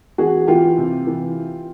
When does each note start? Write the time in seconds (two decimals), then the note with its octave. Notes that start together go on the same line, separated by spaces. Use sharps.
0.18 E3 F#4 G#4
0.47 E3 F4 G4
0.78 C3
1.07 E3